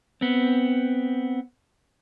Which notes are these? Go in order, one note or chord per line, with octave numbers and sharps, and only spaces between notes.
B3 C4